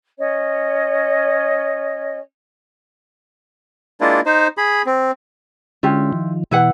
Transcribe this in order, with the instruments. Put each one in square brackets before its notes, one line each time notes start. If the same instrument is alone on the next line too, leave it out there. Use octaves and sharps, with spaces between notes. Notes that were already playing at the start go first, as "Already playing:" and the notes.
[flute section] C#4 C#5 D#5
[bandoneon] G#3 A#3 D4 E4 F4
D#4 C5
G#4 B5
C4
[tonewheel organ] D3 G#3 C#4 [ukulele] E4 F4 G4
[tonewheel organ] D#3 F3
[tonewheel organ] B2 E3 [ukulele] E4 B4 F#5